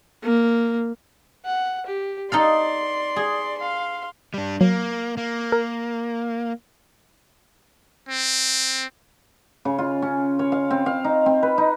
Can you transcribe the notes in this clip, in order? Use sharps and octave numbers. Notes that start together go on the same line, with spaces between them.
A#3
F#5
G4
D#4 A4 D5 F5 C6
G#4
F5 C6
G3 D4
F#3 A#3
A#3
A#4
C4
C#3
F4
C#4
C#5
F5
C4
F5
D#4
C4
B4
D#4